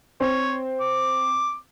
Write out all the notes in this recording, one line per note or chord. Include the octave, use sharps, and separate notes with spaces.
C4 C#5
D6